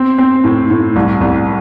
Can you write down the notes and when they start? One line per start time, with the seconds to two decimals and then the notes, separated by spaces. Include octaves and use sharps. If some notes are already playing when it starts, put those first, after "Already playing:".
Already playing: C4
0.18 C4
0.44 A2
0.70 A2
0.96 C2
1.21 C2